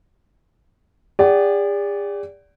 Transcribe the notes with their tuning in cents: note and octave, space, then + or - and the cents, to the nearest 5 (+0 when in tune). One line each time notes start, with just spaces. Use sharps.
G#4 -45 D5 -20 F#5 +40